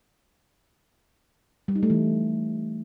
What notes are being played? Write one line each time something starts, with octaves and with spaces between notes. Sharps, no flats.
G3
D#4
A3
E3